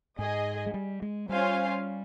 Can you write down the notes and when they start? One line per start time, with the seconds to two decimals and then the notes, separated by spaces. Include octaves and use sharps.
0.19 G#2 G#4 D#5 G#5
0.66 G#3
0.74 G3
1.02 G#3
1.29 G3 C#4 F4 C5 F5 G#5